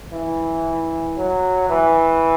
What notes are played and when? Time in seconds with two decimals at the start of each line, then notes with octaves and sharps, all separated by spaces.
0.12 E3
1.15 F#3
1.68 E3